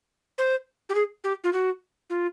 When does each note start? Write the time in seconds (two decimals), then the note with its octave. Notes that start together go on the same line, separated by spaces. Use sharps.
0.38 C5
0.89 G4
0.95 G#4
1.24 G4
1.44 F4
1.53 F#4
2.10 F4